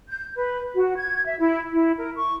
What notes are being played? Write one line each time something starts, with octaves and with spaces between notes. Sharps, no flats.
G6
B4
F#4
G#6
E5
E4
E4
A#4
C#6